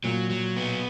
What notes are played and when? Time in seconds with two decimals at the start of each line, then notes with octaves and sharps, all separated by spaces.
0.04 A#2 F#3
0.30 F#3
0.57 B3